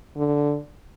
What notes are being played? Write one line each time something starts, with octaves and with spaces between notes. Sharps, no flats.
D3